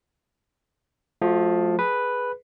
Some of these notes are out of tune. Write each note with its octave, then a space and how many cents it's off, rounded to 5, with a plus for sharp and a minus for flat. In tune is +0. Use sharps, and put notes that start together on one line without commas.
F3 +10 A3 -35 F#4 +0
G#4 +10 B4 +0